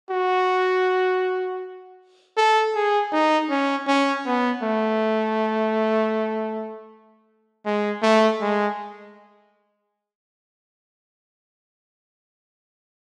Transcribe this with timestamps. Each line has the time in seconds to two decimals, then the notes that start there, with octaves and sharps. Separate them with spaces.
0.10 F#4
2.37 A4
2.75 G#4
3.12 D#4
3.50 C#4
3.87 C#4
4.26 B3
4.63 A3
7.66 G#3
8.02 A3
8.41 G#3